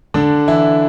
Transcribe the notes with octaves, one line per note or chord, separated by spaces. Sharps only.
D3 D4
E3 E4